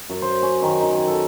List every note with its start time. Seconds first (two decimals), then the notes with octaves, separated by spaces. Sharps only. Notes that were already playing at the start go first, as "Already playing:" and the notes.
0.10 F#2
0.22 C5
0.42 C#4
0.62 D#3
0.80 D#4
0.96 G#5
1.08 A4